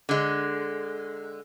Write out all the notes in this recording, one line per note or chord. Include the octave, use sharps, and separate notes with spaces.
D3 G#3